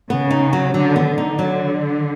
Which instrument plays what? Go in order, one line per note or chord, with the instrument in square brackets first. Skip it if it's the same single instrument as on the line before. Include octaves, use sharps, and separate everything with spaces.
[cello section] C#3 [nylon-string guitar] B3
[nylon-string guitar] D#4
F#3
[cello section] D3 [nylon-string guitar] F#3
[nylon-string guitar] B3
[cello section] D3
[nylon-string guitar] D#4
F#3